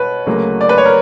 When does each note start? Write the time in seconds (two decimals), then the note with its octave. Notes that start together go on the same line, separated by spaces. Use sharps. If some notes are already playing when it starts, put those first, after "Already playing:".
Already playing: B2 B4 C#5
0.26 D2 C#3 F#3 A#3
0.61 D5
0.69 B4
0.78 C#5
0.86 A#4